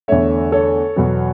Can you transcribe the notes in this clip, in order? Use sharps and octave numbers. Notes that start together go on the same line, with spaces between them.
E2 D3 A3 C#5 E5
A4 C#5
E2 B2 F#3 B3